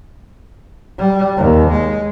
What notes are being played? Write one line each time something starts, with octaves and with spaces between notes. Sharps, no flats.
G3
D#2
G#3